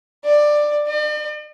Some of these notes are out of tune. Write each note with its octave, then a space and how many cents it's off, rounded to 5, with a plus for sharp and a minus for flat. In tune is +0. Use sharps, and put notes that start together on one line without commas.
D5 +15
D5 +45